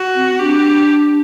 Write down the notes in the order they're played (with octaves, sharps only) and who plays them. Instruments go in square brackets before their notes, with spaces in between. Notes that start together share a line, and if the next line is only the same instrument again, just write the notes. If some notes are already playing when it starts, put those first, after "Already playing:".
Already playing: [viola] F#4
[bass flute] C4
[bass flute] D4 [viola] G4